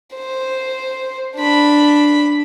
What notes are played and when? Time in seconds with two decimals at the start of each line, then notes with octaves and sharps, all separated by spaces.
0.15 C5
1.37 D4 B5